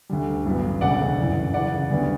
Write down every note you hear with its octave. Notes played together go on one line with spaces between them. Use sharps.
D2 D3 G3
A1 G2 F#3 B3
E1 D2 C#3 D5 F#5
G1 F#2 E3
F#2 C#3 E3 D5 F#5
D2 D3 G3 B3